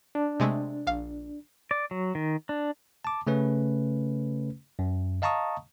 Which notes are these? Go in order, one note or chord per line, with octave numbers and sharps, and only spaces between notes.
D4
C3 G#3 A3
A#1 F5
D5
F#3
D#3
D4
A5 D6
C#3 A3 C#4 B4
F#2
D#5 F5 A5 A#5 C#6 D#6